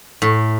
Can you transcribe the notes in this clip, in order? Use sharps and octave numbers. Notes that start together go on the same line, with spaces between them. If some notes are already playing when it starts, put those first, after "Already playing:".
A2